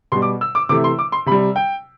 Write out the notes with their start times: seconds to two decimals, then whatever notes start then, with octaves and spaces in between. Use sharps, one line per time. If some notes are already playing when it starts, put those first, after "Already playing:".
0.12 B2 G3 C6
0.22 D6
0.41 E6
0.55 D6
0.69 C3 E3 A3 D6
0.84 C6
0.99 D6
1.12 C6
1.26 C3 B5
1.31 G3
1.56 G5